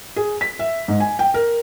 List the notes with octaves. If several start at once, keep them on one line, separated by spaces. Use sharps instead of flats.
G#4
B6
E5
G#2
G#5
G5
A#4